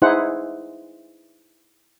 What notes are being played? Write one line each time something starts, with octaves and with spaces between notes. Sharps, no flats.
D#4 E4 G#4 C5 F#5